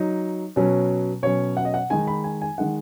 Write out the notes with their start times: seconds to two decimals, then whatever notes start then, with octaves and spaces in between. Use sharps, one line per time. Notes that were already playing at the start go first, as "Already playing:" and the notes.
Already playing: F#3 D#4
0.56 B2 F#3 C#4
1.23 B2 F#3 C#4 C#5
1.57 F#5
1.65 D#5
1.74 F#5
1.90 D#3 G#3 D#4 G#5
2.08 B5
2.24 G#5
2.41 G#5
2.58 D#3 G#3 D#4 F#5